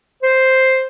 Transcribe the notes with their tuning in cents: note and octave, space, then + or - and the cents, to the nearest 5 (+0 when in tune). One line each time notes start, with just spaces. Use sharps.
C5 +0